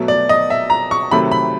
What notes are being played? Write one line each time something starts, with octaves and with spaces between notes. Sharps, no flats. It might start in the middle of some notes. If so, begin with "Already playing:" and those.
Already playing: B2 F#3 A3
D5
D#5
E5
A#5
C#6
C3 D#3 F#3 A3 B5
B5